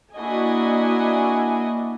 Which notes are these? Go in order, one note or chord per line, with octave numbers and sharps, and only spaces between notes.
A#3 D4 E4 F#4 D#5 G#5